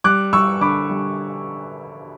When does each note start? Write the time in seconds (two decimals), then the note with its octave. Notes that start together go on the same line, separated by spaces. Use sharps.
0.04 G3 D6 F#6
0.33 G3 C#6 E6
0.61 D3 B5 D6
0.90 G3